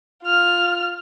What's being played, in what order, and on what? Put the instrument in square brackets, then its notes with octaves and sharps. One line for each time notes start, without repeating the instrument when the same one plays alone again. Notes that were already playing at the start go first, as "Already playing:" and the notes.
[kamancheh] F4 F6